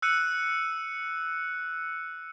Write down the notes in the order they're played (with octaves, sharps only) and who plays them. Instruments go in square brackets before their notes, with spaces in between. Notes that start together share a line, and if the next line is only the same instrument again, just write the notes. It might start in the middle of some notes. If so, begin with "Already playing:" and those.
[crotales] E6 F#6 C#7 D#7